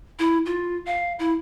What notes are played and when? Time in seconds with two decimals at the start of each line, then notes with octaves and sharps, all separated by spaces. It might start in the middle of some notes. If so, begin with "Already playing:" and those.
0.19 E4
0.46 F4
0.86 F5
1.19 E4